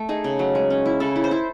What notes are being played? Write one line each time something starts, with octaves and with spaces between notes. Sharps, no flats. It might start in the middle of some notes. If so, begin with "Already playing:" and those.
Already playing: A3
D#4 G#4
C#3
F#3
G#3
C#4
E4
C#3 A4
E4
C5
E4